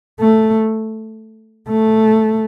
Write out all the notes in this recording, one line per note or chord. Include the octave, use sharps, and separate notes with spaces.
A3
A3